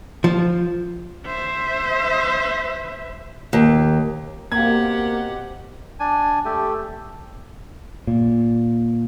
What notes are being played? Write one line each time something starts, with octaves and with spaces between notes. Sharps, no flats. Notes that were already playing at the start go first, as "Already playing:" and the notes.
F3
C5 E5
D#2
B2 A#3 C4 G4 F#5 G#6
D4 G#5
A3 G4
A#2